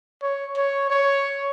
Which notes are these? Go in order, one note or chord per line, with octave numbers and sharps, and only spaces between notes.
C#5
C#5
C#5